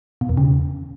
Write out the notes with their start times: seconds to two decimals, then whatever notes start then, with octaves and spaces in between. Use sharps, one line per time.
0.21 B2
0.29 E2
0.37 C#3